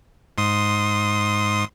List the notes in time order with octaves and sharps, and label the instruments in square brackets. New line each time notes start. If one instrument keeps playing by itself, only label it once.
[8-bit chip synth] G#2 C6 D#6